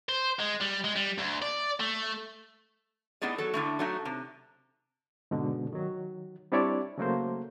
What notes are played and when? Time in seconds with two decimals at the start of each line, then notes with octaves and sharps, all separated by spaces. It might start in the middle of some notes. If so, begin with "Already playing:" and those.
0.09 C5
0.40 G#3
0.61 G3
0.84 G#3
0.95 G3
1.18 D2
1.42 D5
1.80 A3
3.22 A2 B3 D#4 G#4 D5
3.38 F#3 A4
3.54 A2 D3 A3
3.79 F#3 A3 D#4
4.05 C3
5.31 G#2 B2 D3
5.73 D#3 F#3
6.52 G3 C4 D4 E4 C#5 D5
6.98 C#3 F#3 A3 A#3 C5